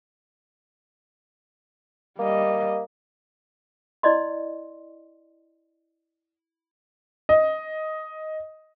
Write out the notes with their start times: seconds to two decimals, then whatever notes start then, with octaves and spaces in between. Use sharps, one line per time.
2.19 G3 A#3 D#5
4.03 E4 D5 D#5 C6
7.29 D#5